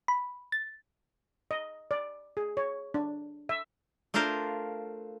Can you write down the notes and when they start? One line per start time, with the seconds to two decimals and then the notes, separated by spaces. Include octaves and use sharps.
0.08 B5
0.52 A6
1.51 D#5
1.91 D5
2.37 G#4
2.57 C#5
2.94 D4
3.49 E5
4.14 A3 D4 F4 A#4 C5 F5